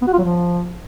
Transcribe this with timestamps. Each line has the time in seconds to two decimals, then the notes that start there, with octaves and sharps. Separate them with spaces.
0.02 B3
0.07 F#4
0.13 F4
0.18 F#3
0.24 F3